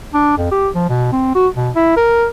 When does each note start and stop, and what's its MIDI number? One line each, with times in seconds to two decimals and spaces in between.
0.14 0.36 62
0.38 0.51 41
0.52 0.69 67
0.75 0.85 53
0.90 1.11 47
1.13 1.33 60
1.35 1.48 66
1.56 1.70 47
1.76 1.94 64
1.97 2.26 70